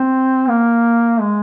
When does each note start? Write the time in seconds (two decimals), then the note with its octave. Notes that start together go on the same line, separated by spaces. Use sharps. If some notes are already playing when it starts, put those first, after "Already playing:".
Already playing: C4
0.49 A#3
1.21 G#3